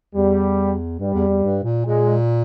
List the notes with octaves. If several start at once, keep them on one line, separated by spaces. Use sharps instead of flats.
E2 G3
G2 G3
E2
E2
G2
A#2
A#2 G#3